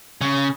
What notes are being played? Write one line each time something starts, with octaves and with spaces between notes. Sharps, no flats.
C#3